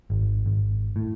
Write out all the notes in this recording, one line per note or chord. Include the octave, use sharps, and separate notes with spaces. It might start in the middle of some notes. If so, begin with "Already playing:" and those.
G#1
G#1
A2